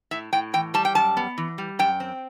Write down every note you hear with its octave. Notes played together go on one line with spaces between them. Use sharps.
A2 E5
A2 G5
E3 G5
G3 A5
G5
F#2 A5
B3
E3
G3
F#2 G5
C4